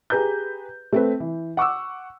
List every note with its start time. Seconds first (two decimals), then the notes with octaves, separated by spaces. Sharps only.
0.10 G4 G#4 B4 A#5 G6
0.93 A3 C4 B4
1.20 E3
1.57 F#5 C#6 D6 E6